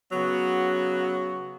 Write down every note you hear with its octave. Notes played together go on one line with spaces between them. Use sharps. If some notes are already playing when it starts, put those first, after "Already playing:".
C#3 F#3 B3 F#4